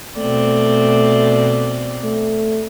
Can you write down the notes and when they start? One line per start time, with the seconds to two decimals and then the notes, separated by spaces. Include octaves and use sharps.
0.17 B2 A3 C4 D5
2.04 A3